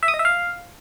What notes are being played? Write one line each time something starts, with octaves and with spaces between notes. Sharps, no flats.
E5
D#6
D#5
E5
F5